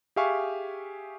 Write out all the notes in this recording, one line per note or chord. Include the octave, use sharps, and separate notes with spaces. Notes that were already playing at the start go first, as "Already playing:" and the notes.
G4 G#4 E5 F5 G#5 C#6